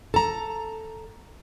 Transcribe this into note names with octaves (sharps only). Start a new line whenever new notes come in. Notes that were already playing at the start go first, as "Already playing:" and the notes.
A4 A#5